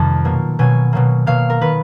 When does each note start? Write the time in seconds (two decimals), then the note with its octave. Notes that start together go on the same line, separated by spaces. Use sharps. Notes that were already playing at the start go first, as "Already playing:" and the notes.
Already playing: F2 C3 D#3 G3 A5
0.25 B2 F#3 A#3
0.59 B2 F#3 A#3 G#5
0.93 B2 F#3 A#3
1.26 B2 F#3 A#3 F5
1.50 A#4
1.61 D#3 F#3 B4